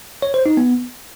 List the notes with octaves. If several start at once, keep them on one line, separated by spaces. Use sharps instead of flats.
C#5
C5
D#4
B3